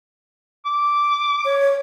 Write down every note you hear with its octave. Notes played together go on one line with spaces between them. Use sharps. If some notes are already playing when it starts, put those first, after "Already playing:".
D6
C#5